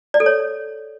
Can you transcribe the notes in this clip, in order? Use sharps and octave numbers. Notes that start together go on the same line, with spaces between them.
D5
A4
C#5